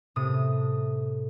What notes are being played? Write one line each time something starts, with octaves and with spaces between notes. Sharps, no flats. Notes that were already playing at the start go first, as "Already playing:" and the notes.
A2 C3 D#6